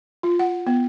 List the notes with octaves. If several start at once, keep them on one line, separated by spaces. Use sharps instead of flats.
F4
F#5
B3